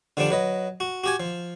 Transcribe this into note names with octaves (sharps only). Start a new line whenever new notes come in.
D3 F3 G3 D4
F#3 B4 D#5
F#4
F#4 G4 G#5
F3